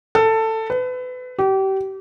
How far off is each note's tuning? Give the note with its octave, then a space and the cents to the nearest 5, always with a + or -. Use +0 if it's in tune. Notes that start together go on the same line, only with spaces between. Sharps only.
A4 +15
B4 +30
G4 -30